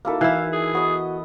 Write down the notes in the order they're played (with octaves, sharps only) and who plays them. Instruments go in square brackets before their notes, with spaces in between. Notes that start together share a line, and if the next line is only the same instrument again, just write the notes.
[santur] A#3 E4 A4 [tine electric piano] D#4 F#4 A#4
[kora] E3 E4 [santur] B4 [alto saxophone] F5
[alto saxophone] G#4
[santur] B3 D#5 [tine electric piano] F#4